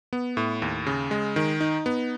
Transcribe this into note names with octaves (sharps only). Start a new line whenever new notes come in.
B3
A2
D#2
C#3
G#3
D#3
D#4
B3